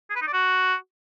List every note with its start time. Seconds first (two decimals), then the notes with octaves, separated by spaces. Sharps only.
0.10 G#4
0.16 B4
0.22 D#4
0.27 D5
0.33 F#4